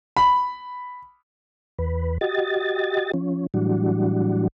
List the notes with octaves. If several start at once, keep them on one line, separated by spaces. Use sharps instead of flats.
B5
E2 B4
F#4 G4 D#5 A6
F3 C#4
A2 E3 F#3 G3 D4 F#4